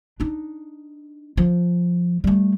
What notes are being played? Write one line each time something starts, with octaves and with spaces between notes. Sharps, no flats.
D4 D#4
F3
G3 A3